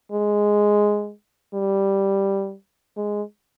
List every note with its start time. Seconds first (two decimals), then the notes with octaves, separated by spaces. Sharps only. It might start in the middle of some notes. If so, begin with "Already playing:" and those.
0.12 G#3
1.54 G3
2.97 G#3